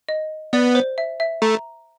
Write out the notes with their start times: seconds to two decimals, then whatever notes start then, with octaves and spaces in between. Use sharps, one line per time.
0.09 D#5
0.53 B3 D5
0.75 C5
0.98 E5
1.20 E5
1.42 A3 A#5